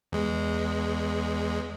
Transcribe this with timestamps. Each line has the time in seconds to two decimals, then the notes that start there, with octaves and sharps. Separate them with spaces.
0.12 E2 G#3